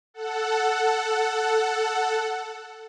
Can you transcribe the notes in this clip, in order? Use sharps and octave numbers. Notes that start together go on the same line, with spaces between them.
A4 F#5